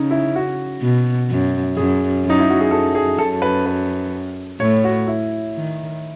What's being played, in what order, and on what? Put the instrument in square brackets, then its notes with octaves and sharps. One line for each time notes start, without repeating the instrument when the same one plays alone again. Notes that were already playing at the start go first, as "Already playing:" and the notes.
Already playing: [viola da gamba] C#3 [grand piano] C#4 D#4
[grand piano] E4
F#4
[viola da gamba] B2
F#2
[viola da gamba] F#2 [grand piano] G#4
[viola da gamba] F#2
[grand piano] D#4
E4
F#4
G#4
[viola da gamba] F#2 [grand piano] A4
[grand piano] G#4
[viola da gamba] F#2 [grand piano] A4
[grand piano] B4
B4
[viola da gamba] A2 [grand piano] C#5
[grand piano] F#4
E4
[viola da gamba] D#3